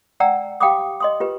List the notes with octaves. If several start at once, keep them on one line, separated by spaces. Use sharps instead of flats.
D5 F#5 G5 A#5 E6
G4 F5 G5 B5 D6 D#6
D#5 C6 D#6
F4 G4 B4